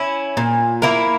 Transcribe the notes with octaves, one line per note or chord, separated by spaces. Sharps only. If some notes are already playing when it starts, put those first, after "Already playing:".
Already playing: C#4 E4
A#2
A#3 E4 A#4